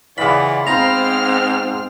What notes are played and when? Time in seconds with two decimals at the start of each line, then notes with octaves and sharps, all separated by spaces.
0.18 C#3 E3 F4 G#4 B4 D5 F#5 B5
0.67 G#2 B3 C4 D#4 F4 A#5 C6 F6